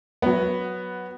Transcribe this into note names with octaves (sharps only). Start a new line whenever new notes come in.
F#3 B3